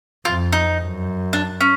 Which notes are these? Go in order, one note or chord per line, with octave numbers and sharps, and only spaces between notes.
F2 F4
D#4
F#2
D4
C#4